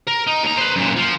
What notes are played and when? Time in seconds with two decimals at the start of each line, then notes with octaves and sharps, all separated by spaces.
0.08 A#4
0.27 D#4
0.43 D#2 A#5
0.57 B4 C5
0.76 F#2 A#2
0.96 F3